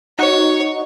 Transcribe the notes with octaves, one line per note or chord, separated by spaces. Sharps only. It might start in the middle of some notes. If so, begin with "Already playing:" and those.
D#4 F#4 C#5